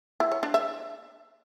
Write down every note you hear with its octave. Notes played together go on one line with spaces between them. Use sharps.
E4
C#5
D4
E5